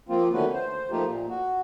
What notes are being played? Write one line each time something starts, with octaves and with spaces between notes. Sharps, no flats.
F3 A#3 C4 F4
D3 D#3 A3 C#4 F#4 B4
C5
F3 A3 A#3 D#4 F4 G4
A#2
F#4